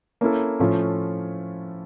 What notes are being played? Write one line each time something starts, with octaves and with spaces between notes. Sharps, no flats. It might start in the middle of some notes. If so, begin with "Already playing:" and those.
A#3 C#4 E4 A4
A2 F3 A3 C#4 F4